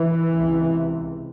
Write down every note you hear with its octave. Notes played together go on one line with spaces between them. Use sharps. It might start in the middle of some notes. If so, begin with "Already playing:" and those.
Already playing: E3
C#2 C3